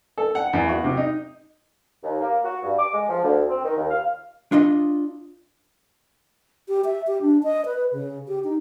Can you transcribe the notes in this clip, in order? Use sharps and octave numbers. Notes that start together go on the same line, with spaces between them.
A4
F#5
E2
F#4
C3
D#4
D#2
A#3
F#4
G2
D6
G#3
F3
D2
C4
D#3
D#2
F5
D4 F4 D#5
G4
E5
G4
D4
D#5
B4
C#3
G4
D#4